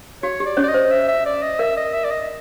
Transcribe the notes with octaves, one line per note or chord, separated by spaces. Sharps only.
F#4 C#5
G4
D5
C#4 C#5
D5
D#5
C5
E5
E5
D5
D#5
A#4 E5
D#5
E5
D5
D#5